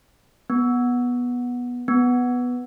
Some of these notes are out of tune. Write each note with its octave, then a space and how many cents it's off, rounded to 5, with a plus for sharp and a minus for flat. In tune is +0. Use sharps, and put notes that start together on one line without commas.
B3 -10
B3 +0